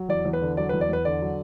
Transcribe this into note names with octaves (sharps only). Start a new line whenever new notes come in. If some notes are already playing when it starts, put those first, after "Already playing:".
Already playing: F#3
E2 D5
E2
B4
D3
F#3 D5
B4
E2
D5
E2 B4
D3 D5
F#3